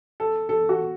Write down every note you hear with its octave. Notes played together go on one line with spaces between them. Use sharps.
A4
A4
F#4